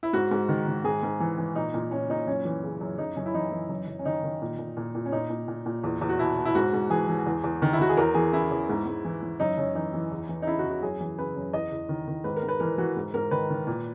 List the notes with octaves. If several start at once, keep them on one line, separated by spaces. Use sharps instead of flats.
E4
G#2 F#4
G#2
D#3
D#3
G#2 G#4
G#2
E3
E3
A#2 D#4
A#2
A#2 C#4
A#2 D#4
F#2 C#4
E3
C#3
F#2
F#2 D#4
F#2 C#4
E4
E3 D#4
E3
F#2
F#2
C#4
D#3 D#4
D#3
A#2
A#2
A#2
A#2
C#4
A#2 D#4
A#2
A#2
A#2
E2
E2
F#4
B2 E4
B2
E4
G#2 F#4
G#2
E3 G#4
E3
E2
E2
D#3
E4
D#3 F#4
G#4
E2 A#4
E3 G#4
C#3 E4
E2
G#2
G#2
E3
E3
F#2 D#4
F#2 C#4
E3 D#4
E3
E2
E3
D#4
C#3 E4
F#4
E2
F#4
F#2 G#4
E3
C#3 B4
F#2
E2 D#5
E2
D#3
D#3
G#2 B4
A#4
G#2
B4
E3 A#4
E3 F#4
G#2
G#2 A#4
D#3 B4
D#3
A#2